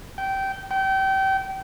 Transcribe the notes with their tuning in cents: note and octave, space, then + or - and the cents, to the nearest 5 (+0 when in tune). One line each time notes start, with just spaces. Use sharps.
G5 -20
G5 -30